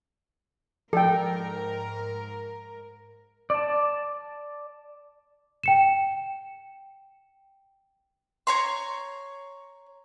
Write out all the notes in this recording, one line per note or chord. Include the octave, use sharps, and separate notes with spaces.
G#2 F3 A4 A#4 G5
D5 A5
G5 C#7 E7
C#5 A#5 C6